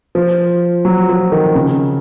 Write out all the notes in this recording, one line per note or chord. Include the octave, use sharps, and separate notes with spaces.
F3
F#3
F3
D#3
C#3